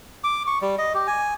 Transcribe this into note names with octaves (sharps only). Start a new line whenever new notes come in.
D6
C#6
G3
D#5
G4
G#5